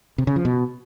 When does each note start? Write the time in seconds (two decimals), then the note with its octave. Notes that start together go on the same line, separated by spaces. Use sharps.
0.18 C3
0.27 C#3
0.36 F3
0.45 B2